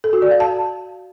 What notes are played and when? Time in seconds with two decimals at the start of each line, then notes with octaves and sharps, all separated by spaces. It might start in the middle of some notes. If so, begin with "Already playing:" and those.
0.04 A4
0.13 F#4
0.22 D5
0.31 F5
0.40 A5